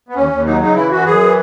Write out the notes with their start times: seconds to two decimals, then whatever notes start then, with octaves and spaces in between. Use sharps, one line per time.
0.09 B3
0.15 D#2 C#4
0.30 D#2
0.45 F#3 D#4
0.61 C#3 D#4
0.75 E3 E4
0.91 F#2 F#4
1.05 F#2 G#4
1.20 E3